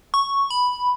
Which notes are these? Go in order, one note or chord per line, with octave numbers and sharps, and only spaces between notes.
C#6
B5